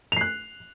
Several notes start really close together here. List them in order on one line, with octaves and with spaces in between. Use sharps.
F7 C7 F#6